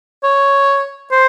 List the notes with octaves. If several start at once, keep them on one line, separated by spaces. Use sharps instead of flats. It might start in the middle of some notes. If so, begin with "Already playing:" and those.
C#5
C5